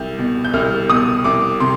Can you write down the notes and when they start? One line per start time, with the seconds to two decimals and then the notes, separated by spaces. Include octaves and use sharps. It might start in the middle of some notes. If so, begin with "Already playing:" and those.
Already playing: C2 G6
0.19 B2
0.45 G6
0.53 C2 F6
0.89 B2 D#6
1.24 C2 D6
1.60 C3 C6